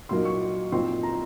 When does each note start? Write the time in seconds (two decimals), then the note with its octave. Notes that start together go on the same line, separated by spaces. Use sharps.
0.09 A#2 F#3 A#3 D#4 C6
0.25 C#6
0.72 A#2 F3 C4 D#4 C6
1.03 A#5